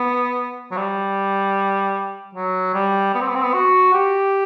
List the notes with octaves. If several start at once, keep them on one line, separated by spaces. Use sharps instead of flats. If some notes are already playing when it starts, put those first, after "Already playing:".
Already playing: B3
F#3
G3
F#3
G3
B3
C4
B3
C4
B3
F#4
G4